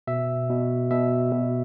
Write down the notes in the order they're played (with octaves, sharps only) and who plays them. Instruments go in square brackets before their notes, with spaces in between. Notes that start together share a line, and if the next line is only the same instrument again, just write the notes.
[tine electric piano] B2 E5
B2
B2 E5
B2